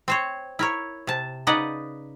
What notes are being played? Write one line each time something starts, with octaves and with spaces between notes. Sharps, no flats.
C4 C5 C#5
E4 A#4 C#5
C3 A5
C#3 D#4 B4 D5 D#5 F#5